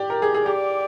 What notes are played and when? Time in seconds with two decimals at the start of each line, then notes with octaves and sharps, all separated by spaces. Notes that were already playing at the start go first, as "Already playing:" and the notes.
Already playing: G4 D5
0.10 A#4
0.22 G#4
0.35 G#4
0.46 G4 D5